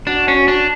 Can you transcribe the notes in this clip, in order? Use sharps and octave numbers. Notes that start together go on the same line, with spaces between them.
D4 F#4
C#4
D4